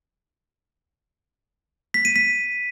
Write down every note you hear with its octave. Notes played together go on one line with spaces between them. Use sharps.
B6
D#7
B6